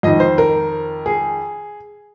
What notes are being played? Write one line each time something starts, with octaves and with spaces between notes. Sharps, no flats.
F2 D#3 D#5
C5
A#4
G#4